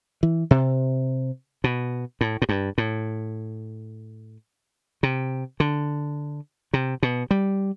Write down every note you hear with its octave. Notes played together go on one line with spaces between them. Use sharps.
E3
C3
B2
A2
A2
G2
A2
C3
D3
C3
B2
G3